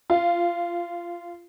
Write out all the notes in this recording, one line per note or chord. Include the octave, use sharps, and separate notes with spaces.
F4